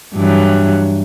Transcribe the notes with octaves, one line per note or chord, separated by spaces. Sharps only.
G2 E3 F#3